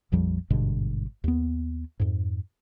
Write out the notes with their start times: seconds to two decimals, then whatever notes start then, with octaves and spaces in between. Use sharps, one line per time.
0.12 A#1 F2 F3 G3
0.50 G#1 G2 B2 D3
1.24 D#2 B3
2.00 F2 G#2